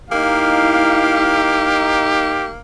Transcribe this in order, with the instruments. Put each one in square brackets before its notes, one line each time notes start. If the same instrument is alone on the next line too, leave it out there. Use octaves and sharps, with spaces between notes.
[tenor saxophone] A#3 [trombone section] D#4 [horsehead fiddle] E4 F5 [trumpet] G4